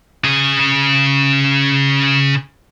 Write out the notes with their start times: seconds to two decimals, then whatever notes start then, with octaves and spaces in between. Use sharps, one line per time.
0.25 C#3 G#4